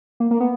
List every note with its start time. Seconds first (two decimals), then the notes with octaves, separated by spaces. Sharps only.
0.20 A#3
0.31 A#3
0.40 B3